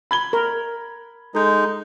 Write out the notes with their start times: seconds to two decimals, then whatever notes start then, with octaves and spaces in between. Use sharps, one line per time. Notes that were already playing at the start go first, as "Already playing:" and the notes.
0.11 B5 G#6 G7
0.33 A#4
1.35 G#3 D#4 A4 G6